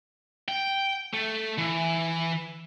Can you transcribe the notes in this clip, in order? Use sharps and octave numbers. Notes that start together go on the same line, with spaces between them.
G5
A3
E3